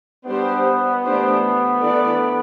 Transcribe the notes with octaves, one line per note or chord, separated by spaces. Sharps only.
G3 B3 D4 G4 C5
E3 A3 D4 G4 C5
E3 A3 D4 A4 D5